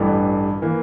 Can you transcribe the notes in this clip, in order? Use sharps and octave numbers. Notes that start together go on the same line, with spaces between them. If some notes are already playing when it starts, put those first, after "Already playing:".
Already playing: A1 G2 E3 A3
E3 A#3